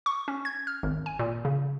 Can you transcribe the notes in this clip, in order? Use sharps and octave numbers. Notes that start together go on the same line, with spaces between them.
C#6
C#4
G#6
F6
G#1
G#5
A#2
C#3